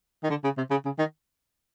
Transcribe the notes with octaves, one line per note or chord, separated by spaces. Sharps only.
D#3
D3
C#3
C3
C#3
C#3
D#3